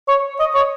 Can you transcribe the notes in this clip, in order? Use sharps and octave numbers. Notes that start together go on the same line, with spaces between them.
C#5
D#5
C#5